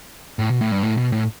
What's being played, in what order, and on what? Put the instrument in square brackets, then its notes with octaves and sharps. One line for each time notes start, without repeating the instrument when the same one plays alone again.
[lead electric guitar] A2
B2
A2
G2
A2
B2
A2